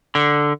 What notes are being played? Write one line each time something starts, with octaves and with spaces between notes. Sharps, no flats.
D3